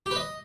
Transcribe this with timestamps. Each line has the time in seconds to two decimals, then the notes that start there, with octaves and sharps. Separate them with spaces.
0.06 G4
0.11 B4
0.16 D#5